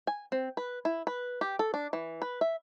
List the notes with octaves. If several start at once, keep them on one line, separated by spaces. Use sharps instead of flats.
G#5
C4
B4
E4
B4
G4
A4
D4
E3
B4
E5